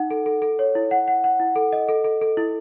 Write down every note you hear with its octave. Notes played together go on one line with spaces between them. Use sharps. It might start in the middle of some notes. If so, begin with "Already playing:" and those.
Already playing: D#4 F#5
A4
A4
A4
C#5
E4
F#5
F#5
F#5
E4
A4
D#5
A4
A4
A4
E4